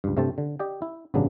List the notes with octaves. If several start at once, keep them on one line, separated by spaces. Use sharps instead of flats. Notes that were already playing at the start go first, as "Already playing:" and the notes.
C#2 G2
G2 C3 A3 C4 C5 A5
D3
G4 D5 D#5 G5
E4
A1 G2 C#3 F#3 B3 D4